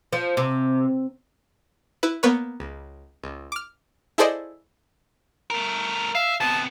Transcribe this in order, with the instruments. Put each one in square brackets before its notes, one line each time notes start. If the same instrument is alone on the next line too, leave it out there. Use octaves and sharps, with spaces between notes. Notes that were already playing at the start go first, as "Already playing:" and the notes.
[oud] F3
C3
[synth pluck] E4 B4
A#3 B3 B4 C#5
C#2
C#2
D6 F6
E4 G#4 A4 C5 D5 D#5
[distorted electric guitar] A3 A#4
[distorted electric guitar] E5 [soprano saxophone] F5
[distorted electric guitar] C3 B3 [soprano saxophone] A5